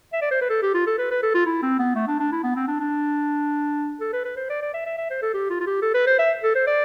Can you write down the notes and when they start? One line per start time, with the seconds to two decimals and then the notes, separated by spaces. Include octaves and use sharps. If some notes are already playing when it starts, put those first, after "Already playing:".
0.13 E5
0.22 D5
0.31 C5
0.41 B4
0.49 A4
0.62 G4
0.74 F4
0.87 A4
0.98 B4
1.11 B4
1.23 A4
1.35 F4
1.46 E4
1.62 C4
1.79 B3
1.95 A3
2.07 D4
2.20 D4
2.32 E4
2.44 B3
2.56 C4
2.68 D4
2.80 D4
4.00 A4
4.13 B4
4.25 B4
4.37 C5
4.49 D5
4.61 D5
4.74 E5
4.86 E5
4.97 E5
5.10 C5
5.22 A4
5.34 G4
5.50 F4
5.60 F4
5.67 G4
5.82 A4
5.94 B4
6.07 C5
6.19 E5
6.43 A4
6.55 C5
6.67 D5